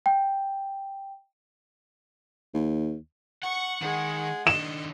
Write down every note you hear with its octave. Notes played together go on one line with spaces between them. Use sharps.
G5
D#2
F#5 C#6
D#3 G#3 G#4
D#3 D4 D#5 E7